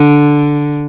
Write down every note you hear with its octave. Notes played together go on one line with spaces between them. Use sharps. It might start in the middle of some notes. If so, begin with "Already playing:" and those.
Already playing: D3